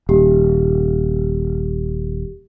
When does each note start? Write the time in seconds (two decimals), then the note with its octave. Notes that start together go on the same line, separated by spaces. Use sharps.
0.09 D#1 G4